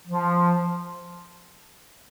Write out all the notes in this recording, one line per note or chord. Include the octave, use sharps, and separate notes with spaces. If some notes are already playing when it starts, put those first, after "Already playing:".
F3